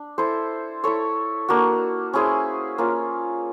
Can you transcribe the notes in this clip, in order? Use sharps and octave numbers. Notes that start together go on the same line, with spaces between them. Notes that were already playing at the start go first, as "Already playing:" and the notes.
Already playing: D4
E4 A4 C5
E4 A4 C#5
A#3 D4 F#4
C#4 E4 G#4 C5
A#3 C#4 F4